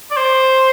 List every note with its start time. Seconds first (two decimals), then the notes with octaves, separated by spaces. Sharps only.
0.11 D5
0.17 C5